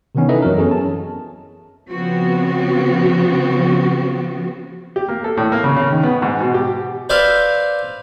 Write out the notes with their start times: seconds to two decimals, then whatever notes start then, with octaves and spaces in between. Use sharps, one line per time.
0.15 C3 D#3 E3 B3 C#4 D#4
0.29 D#4 E4 A4 B4 D#5 E5
0.42 F#2 E3 F#3 C4 A#4
0.57 B3 C#4 G#4 A4
0.71 A5
1.90 C#3 F3 B3 C4 F#4
4.96 G4
5.08 A#3
5.24 A4
5.37 A2
5.52 A#3
5.64 C#3
5.76 C#3
5.92 D#3
6.03 B3
6.22 G#2
6.40 B2
6.54 G4
7.09 B4 C5 D5 E5 F5